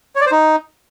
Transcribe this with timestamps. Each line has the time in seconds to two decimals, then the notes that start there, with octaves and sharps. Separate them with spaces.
0.16 C#5
0.21 D5
0.26 C5
0.32 D#4